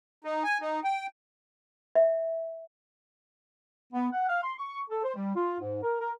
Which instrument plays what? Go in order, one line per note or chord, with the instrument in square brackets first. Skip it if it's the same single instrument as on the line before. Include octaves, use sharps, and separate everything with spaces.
[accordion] D#4
G#5
D#4
G5
[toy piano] E5
[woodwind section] B3
F#5
F5
C6
C#6
A4
C5
G3
F4
G#2
A#4
A#4